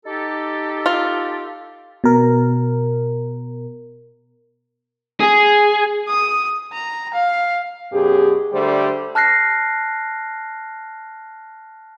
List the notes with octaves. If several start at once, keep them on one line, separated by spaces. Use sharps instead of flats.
D#4 G4 A4
F4
B2 A#4
G#4
D#6
A#5
F5
F#2 B2 G4 G#4
D3 G3 A3 C5
A5 F6 F#6 A#6 C7